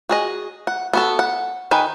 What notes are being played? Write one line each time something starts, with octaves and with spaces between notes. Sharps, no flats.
F#4 G#4 D#5
F#5
B3 F#4 A4
F#5
D#3 B4 G#5